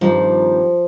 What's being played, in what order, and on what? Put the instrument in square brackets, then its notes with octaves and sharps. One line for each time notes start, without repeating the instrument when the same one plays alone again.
[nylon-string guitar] G2 D#3 G3 C4 D#4 [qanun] F3